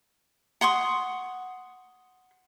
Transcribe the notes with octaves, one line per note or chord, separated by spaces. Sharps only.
F#5 C6 C#6 D#6